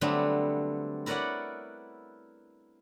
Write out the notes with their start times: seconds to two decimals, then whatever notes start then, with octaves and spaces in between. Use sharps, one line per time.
0.01 D3 F#3 G3 A3 B3 C4
1.06 E4 A#4 B4 C#5 D5 F#5